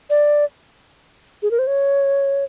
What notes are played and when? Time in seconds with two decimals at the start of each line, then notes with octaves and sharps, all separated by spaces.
0.10 D5
1.43 G#4
1.51 A#4
1.59 C5
1.67 C#5